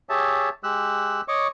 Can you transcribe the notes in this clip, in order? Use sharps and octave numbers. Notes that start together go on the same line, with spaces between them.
G4 G#4 C#5 E5 A5
G#3 G4 E6 F#6
C#5 D#5 C#6 D6